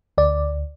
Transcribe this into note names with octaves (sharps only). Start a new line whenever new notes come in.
D2 D5